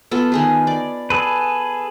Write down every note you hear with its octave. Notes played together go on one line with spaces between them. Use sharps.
B3 F4 A4
D#3 G#4 B4
D5
G#4 A4 B4